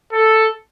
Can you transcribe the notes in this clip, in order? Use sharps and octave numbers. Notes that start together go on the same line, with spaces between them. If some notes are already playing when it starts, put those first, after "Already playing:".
A4